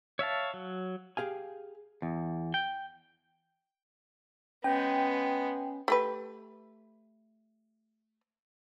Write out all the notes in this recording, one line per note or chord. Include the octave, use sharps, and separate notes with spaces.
C#5 E5 F5 A5
F#3
G4 G#4 F5 G#5
E2
G5
G#3 B3 C#4 G5
A3 G4 B4